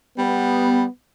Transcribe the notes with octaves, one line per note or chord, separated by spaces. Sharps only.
G3 B3